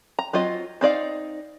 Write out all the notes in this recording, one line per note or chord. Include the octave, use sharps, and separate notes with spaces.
A#5
F#3 C4 F4 D#5
C4 D#4 D5 F5